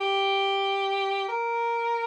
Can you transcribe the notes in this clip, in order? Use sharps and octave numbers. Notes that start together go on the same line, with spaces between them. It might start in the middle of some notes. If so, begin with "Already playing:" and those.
G4
A#4